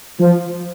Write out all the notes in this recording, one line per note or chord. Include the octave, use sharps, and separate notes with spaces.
F3